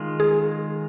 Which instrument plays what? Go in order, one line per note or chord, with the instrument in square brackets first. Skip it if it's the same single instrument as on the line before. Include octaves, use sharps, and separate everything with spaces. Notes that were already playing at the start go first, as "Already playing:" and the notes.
Already playing: [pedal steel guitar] D#3 G#3 F4
[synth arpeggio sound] G#4